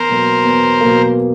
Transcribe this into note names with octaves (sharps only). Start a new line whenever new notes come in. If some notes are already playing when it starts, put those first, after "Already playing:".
Already playing: E2 A#4 C5
B2 F#3 A#3
E2
B2 F#3 A#3